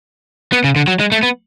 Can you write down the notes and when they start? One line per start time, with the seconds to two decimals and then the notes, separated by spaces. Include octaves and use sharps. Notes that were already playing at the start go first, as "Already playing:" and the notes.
0.53 B3
0.64 C#3
0.76 D3
0.88 F#3
1.00 G#3
1.12 A3
1.23 B3